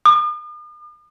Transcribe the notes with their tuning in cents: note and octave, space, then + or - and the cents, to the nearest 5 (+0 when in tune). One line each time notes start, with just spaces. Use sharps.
D#6 -45